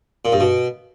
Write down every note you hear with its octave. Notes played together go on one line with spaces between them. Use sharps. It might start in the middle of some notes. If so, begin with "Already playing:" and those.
A#2
G2
B2